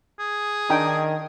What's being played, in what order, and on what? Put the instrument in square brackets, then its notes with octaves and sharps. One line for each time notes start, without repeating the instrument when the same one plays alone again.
[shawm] G#4
[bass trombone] D#3 [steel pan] D4 D#4 G5